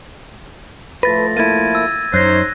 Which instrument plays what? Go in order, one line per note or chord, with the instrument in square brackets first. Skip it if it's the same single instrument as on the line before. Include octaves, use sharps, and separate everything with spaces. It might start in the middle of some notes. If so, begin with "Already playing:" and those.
[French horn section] A2 F3 A3 [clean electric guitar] B4 [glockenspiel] A6 A#6
[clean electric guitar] A#3 E4 [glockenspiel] G#6 A6 D#7
[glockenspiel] E6
[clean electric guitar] F#2 [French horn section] D#4 C#5 [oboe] C5 [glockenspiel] F#6 A#6